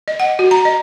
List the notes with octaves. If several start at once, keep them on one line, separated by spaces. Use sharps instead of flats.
D#5
F#5
F#4
A#5
D#5